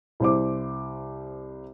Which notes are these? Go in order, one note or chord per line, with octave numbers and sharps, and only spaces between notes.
C2 C5 D6